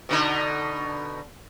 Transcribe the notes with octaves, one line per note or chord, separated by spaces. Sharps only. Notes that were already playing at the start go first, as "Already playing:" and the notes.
B2 D3 D#4